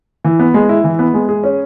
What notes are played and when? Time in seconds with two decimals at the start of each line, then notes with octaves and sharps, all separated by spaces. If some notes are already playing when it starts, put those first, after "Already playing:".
0.24 E3
0.39 B3
0.54 G#3
0.69 E4
0.84 E3
0.99 B3
1.14 G#3
1.29 G#4
1.44 C#4